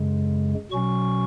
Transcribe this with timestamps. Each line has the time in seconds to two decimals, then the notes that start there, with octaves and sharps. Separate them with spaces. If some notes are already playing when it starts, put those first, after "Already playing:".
Already playing: F#2 C#3 G#3
0.71 B2 F#3 C#4 C#6